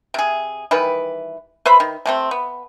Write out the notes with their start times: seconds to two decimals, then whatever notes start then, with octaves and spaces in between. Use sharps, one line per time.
0.14 C3 G#4
0.71 D#3 E3 G3 B4
1.66 B4 C5 E5 B5
1.80 D#3
2.06 C3 A3 C4
2.31 B3